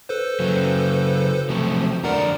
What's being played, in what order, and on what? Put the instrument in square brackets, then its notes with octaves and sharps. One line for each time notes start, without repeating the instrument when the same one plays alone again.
[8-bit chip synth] A4 B4 C5
[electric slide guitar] C#3 F#3
[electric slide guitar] C3 F#3 A3 [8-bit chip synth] F3
[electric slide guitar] F2 D3 D5 [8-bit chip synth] A#4 F#5 A#5